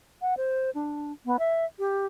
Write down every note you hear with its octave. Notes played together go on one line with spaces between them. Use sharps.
F#5
C5
D4
B3
E5
G4